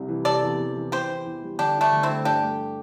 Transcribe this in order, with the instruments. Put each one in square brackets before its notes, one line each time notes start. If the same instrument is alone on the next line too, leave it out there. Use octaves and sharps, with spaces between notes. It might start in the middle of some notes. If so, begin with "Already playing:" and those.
Already playing: [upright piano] C2 C3 G3
E3
[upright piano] C3 [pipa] A4 D5
[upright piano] E2
E2
E3
[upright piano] E3 [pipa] G4 C5
[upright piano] E4
E2
G3
[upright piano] D3 [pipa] D4 G4
[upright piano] E4
[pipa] A3 D4
[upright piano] D2
[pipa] C4 E4
[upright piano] A3
[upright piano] G2 [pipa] D4 G4
[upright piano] A3